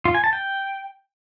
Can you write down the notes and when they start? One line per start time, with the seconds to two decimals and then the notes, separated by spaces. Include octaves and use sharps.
0.05 F4
0.15 G#5
0.24 A5
0.33 G5